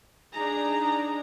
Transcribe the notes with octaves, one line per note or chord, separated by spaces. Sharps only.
D4 D#4 G#4 A#5